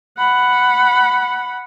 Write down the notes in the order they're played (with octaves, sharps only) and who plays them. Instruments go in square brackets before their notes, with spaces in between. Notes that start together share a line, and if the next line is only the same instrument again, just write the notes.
[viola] F#5 B5